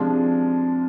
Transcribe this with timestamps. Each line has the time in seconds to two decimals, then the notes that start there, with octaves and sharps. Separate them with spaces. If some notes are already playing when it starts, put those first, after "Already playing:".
Already playing: C3 F3 G#3 D4